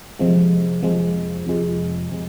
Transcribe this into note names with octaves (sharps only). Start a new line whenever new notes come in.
F2 C3 F3 G#3
F2 C3 F3 G#3
F2 C3 F3 G#3
C3 F3 G#3